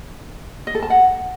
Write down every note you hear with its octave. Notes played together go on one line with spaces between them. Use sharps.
D#5
A4
A5
F#5